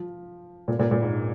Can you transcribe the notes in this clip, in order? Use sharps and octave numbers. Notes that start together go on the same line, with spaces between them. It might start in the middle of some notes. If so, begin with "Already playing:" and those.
Already playing: F3
A#2
A#2
A#2
G#2